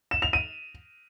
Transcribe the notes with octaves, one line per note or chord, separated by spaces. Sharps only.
E7
F7
D#7